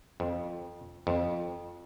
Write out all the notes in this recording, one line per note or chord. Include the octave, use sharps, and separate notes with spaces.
F2
F2